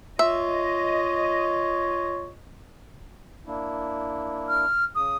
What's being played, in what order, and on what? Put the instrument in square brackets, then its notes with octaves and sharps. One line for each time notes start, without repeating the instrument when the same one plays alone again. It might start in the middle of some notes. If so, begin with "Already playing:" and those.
[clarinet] F4 [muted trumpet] C#5 [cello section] D#5 [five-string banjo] E5
[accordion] A#3 D4 E4
[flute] F6
[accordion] C#3 [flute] D#6